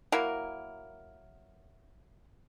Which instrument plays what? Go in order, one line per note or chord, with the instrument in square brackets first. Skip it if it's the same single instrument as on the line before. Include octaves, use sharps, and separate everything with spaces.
[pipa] F#3 A#3 E4 A#4